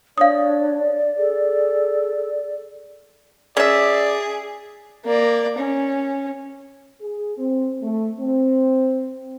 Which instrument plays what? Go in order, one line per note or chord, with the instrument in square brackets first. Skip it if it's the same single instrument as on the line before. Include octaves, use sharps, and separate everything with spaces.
[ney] D4 [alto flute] C#5 [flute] D5 [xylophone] F5 D#6
[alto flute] G#4 [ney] A4
[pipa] C#4 E5 [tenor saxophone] G#4 [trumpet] D5
[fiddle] A#3 D5
C#4
[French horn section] G#4
C4
A3
C4